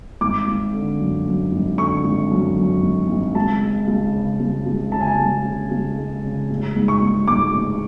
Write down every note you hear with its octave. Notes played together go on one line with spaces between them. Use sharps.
G#1 D6
G#1
D3
F#2
F#2
G#1
D3 C#6
G#1
F#2
F#2
G#1
G#1
C#2 A5
G#3
C#2
C#3
C#2
C#2
C#3 A5
G#5
A5
C#2
C#3
C#2
G#3
C#3
A1
G#2
C#6
G#2
G#2 D6
A1